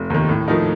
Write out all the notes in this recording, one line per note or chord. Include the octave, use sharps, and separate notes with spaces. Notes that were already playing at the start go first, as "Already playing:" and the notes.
Already playing: F1
D#2 D#3
A2
F3 A3 D#4 A#4